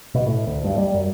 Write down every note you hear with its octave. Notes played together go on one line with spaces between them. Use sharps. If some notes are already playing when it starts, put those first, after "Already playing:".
B2
A2
D2
G2
G3
F#2